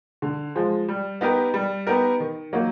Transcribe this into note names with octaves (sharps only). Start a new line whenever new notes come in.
D3
F3 G#3
G3
B3 D#4 G4 A#4
G3
B3 D#4 G4 A#4
D#3
F#3 A#3 D#4 F#4